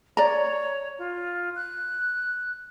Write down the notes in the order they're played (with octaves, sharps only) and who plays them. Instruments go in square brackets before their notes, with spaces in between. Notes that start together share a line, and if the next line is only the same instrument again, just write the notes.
[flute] C#5 [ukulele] D5 A#5
[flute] F4
F#6